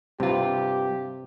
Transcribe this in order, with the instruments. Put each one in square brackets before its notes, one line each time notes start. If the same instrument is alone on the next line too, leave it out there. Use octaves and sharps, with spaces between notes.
[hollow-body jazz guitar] G2 F4 [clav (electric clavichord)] C3 [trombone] G4